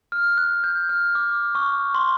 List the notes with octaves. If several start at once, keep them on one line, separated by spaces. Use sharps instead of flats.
F6
F#6
G6
F6
D6
C#6
C6